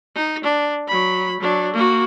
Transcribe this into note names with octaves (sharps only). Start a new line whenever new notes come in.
D#4
D4
F#3 B5
F#3 D4
A#3 F#4